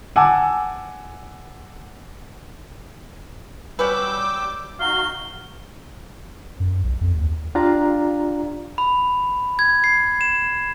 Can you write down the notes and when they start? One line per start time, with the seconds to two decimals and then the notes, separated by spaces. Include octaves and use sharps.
0.16 F#5 G#5 A5 D6 E6
3.79 B2 G3 C#4 B4 D6 E6 G6
4.80 D#4 F#4 F5 G7
6.60 F#2
6.84 B1
7.01 F2
7.15 D#2
7.55 D4 F4 G4 D5 F5 A#5
8.78 B5
9.59 G#6
9.84 C7
10.21 E7